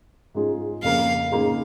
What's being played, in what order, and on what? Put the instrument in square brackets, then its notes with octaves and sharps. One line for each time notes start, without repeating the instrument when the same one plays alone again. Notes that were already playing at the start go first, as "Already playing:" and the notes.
[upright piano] G#2 G#3 C#4 F4 G#4
[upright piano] F2 C#3 A#3 [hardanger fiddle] F5
[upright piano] C#3 A#3 D#4 G#4